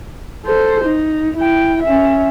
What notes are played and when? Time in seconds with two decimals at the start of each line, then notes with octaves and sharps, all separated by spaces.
0.46 A4 C5
0.85 D#4
1.37 E4 G5
1.83 C#4 E5